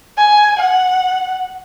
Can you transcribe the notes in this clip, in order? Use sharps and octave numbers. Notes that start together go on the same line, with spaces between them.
G#5
F#5